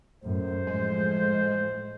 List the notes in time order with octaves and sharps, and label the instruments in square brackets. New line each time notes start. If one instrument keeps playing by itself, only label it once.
[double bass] F#2 A2 [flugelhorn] C5
[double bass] A2 F3 [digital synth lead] G#3